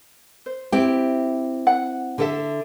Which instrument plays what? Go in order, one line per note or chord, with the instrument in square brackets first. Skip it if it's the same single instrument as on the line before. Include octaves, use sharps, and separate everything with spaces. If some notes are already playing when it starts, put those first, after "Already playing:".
[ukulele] C5
[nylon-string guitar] C4 E4 G4
[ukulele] F#5
[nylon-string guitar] D3 A4 E5